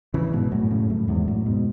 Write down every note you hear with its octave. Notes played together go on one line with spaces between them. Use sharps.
C#3 E3
G#2 B2
F#2 A2
A2 C#3
F#2 A2
E2 G#2
F#2 A2
G#2 B2